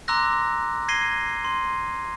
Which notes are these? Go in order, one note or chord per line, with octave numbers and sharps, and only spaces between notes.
A#5 C6 D6 E6 F#6 A#6
G#6 A#6 C7 D#7 G7
C6